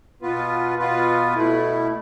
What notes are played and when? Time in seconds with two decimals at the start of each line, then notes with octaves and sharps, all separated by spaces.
0.22 B2 B3 F4 B4
0.78 B2 B3 F4 B4
1.34 B2 A3 E4